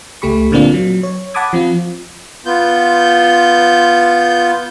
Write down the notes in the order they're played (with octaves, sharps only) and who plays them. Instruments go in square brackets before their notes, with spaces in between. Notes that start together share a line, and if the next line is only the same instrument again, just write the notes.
[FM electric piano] C#2 A3 G4 B5 C#6
A#2 D3 A#3 C4 D4 F4
F#3
C#5
F#5 A5 B5 D6 D#6 G#6
F3 C4 F4
[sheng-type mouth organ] B3 F4 G6